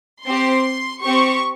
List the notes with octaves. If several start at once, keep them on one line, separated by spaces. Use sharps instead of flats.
C4 G4 C6
C4 G4 C#6